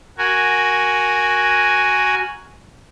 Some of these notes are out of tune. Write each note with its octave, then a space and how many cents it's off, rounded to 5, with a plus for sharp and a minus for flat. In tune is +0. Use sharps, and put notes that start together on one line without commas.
F#4 +0 A#4 +0 G#5 +0